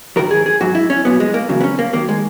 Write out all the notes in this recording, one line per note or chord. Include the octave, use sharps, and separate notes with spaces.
G#2 D#3 F#3 A#4
G#4
G#4
G#2 F#3 F#4
E4
C#4
B1 A#2 F#3 B3
G#3
A#3
E2 C#3 F#3
B3
C#4
A#3
D#2 D#3 F#3 A#3
G#3